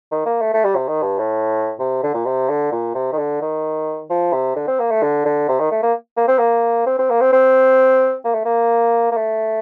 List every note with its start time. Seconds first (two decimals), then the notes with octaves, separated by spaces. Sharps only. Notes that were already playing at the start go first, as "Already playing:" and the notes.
0.11 D#3
0.26 A#3
0.41 A3
0.54 A3
0.64 G3
0.76 C3
0.88 D#3
1.02 G2
1.19 A2
1.79 C3
2.03 D3
2.14 A#2
2.26 C3
2.49 D3
2.72 A#2
2.95 C3
3.12 D#3
3.18 D3
3.42 D#3
4.10 F3
4.33 C3
4.56 D3
4.68 C4
4.80 A#3
4.91 A3
5.03 D3
5.26 D3
5.48 C3
5.60 D#3
5.71 A3
5.83 A#3
6.17 A#3
6.28 C4
6.38 A#3
6.86 C4
6.99 C4
7.10 A#3
7.21 C4
7.33 C4
8.25 A#3
8.34 A3
8.45 A#3
9.11 A#3
9.17 A3